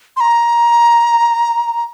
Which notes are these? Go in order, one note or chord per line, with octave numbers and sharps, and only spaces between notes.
C6
A#5